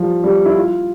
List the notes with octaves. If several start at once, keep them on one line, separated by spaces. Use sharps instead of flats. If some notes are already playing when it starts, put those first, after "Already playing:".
Already playing: F3 G3
G3
E4
F4